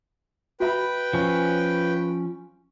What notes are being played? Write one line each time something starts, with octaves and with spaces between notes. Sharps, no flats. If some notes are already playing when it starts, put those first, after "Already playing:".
F#4 B4 E5 G5 B5
F3 C#4